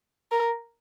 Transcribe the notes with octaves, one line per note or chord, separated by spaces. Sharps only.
A#4